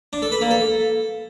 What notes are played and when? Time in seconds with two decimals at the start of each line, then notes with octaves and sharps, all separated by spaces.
0.13 D4
0.22 A4
0.32 B4
0.41 A#3
0.51 A4